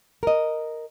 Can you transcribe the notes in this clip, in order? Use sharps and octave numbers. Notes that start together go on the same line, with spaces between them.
A#4 D#5